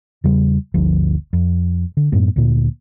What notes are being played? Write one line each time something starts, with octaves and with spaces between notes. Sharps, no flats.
E2 C#3 G3
G1 D2 F3
F2
D3
F#2 A2 B3
D2 A#2